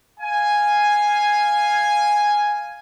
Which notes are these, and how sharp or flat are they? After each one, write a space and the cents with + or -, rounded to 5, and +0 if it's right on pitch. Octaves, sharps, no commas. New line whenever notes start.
F5 +0 G#5 +0